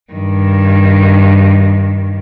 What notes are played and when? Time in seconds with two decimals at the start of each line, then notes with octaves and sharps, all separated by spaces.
0.13 G2 D#3